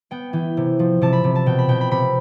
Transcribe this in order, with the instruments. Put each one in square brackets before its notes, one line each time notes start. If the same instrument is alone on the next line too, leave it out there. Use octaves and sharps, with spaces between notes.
[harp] B3 G5
E3 G5
C3
F3
C3 A5
B5
C3
A5
B2 G5
B5
B2 G5
B5
C3 B5